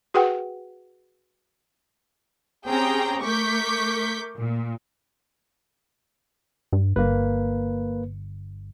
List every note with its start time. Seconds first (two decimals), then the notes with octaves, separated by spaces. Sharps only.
0.14 F#4 G#4 B4 F#5 G5
2.68 C4 C#4 G4 G#4 G5 A#5
3.25 A3 A#4 C#6 D6 G6 B6
4.36 A#2
6.73 G2
6.96 G1 A#3 B4